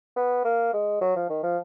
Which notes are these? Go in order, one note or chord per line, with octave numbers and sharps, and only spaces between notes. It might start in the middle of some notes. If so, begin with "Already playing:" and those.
B3
A#3
G#3
F#3
F3
D#3
F3